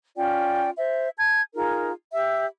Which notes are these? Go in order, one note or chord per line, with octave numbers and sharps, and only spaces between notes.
C#4 F4 D5 G5
C5 E5
A5 G#6
D#4 F4 G#4 A#4
G4 E5